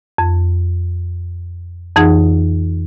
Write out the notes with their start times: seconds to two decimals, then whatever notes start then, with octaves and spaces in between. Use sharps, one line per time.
0.18 F2
1.96 F2 E3 D#4 G#4 F#5